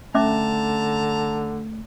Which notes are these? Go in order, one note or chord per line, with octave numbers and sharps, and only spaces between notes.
D3 A3 C#4 E5 A5 A#5 D6